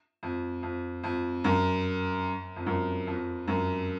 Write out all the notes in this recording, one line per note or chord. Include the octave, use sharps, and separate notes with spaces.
F2
F2
F2
F#2
F2
F#2
F2
F#2